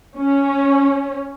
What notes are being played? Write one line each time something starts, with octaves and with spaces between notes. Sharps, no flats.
C#4